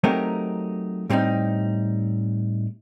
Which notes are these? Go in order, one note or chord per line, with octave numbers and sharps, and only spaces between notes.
F#3 A3 C4 D#4 G4 A#4
A2 G3 C4 D4 D#4